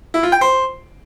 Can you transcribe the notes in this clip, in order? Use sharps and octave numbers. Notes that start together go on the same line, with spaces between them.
E4
F4
G5
C5